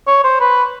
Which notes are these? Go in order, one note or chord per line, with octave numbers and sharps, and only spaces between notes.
C#5
C5
B4